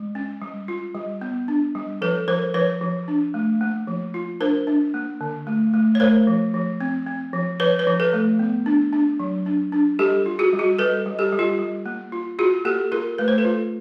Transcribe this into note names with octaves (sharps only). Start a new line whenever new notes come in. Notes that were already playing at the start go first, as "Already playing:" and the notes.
Already playing: G#3
C#4
G3
F4
G3
B3
D4
G3
F3 A4 B4
F3 A#4 C5
F3 B4 C#5
F3
D4
A3
A#3
F3
F4
D4 A#4 C5
D4
A#3
D3
A3
A3
C#5
A3 A#4 C5
F3
F3
C4
C4
F3
F3 B4 C#5
B4 C#5
F3
A4 B4
A3
B3
D4
D4
F#3
D4
D4
G3 G4 A4
F4
F#4 G#4
G3
F#4 G#4
G3 A4 B4
G3
G4 A4
G3
F4 G4
G3
A#3
F4
F4 F#4 G#4
A#3 G4 A4
F4 G#4 A#4
A3 B4
C5
A4 B4
F4